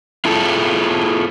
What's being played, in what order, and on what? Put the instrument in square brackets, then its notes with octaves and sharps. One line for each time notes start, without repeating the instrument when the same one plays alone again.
[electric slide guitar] E4 F4 G#4 A4